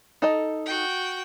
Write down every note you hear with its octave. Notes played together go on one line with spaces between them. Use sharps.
D#4 A4 D#5
F#4 G5